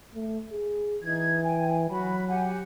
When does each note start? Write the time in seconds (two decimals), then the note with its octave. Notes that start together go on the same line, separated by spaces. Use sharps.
0.14 A3
0.52 G#4
1.03 E3 D#4 G#6
1.44 G5 G#5
1.89 F#3 F#4 B5
2.29 G4 F#5 G#5